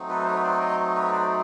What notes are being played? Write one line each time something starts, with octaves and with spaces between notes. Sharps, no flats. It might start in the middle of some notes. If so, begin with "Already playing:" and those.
Already playing: F#3 A3 C4 D#4
A4 B4
C5
B4 C#5
C5 D5
C#5 D#5
B4 C#5
C5 D5